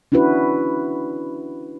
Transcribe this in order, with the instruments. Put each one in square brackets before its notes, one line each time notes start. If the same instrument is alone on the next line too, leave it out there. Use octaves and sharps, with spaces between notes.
[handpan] C#4 D4 E4 F#4 B4